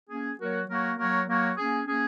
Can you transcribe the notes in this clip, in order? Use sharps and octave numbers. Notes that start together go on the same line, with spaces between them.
A#3 C#4 G#4
F#3 A#3 F#4 A#4 C#5
F#3 A#3 F#4 A#4 C#5
F#3 A#3 F#4 A#4 C#5
F#3 A#3 F#4 A#4 C#5
A#3 C#4 G#4
A#3 C#4 G#4